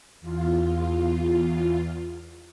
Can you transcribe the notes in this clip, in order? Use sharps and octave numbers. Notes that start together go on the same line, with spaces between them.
E2 F4